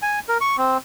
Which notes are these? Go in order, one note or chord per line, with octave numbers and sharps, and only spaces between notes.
G#5
A#4
C#6
C4